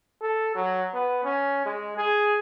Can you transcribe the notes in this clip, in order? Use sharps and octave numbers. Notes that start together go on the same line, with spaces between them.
A4
F#3
B3
C#4
G#3
G#4